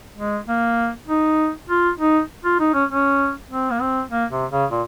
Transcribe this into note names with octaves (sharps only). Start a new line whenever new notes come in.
G#3
A#3
D#4
F4
D#4
F4
D#4
C#4
C#4
C4
A#3
C4
A#3
C3
C#3
A#2